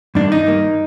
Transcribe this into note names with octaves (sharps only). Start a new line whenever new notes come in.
G2 D#3 A#3 D4
D#4
G2 D#3 A#3